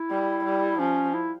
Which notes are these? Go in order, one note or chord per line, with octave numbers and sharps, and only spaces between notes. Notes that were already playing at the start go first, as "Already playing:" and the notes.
Already playing: E4
G3
G3
F3 C#4
E4